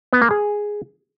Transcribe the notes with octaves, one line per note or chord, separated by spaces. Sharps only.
B3
A#3
G#4